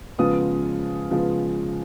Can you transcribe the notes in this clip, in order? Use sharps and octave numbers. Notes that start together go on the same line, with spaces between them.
C#3 F3 G#3 B3 F4 D#6
C#3 F3 G#3 B3 F4